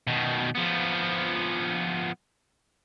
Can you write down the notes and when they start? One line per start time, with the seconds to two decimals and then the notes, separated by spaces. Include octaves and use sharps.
0.07 B2 D#3
0.55 F3 B3